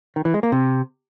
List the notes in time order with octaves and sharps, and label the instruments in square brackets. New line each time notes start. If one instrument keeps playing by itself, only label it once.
[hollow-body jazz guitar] D#3
E3
G#3
A#3
C3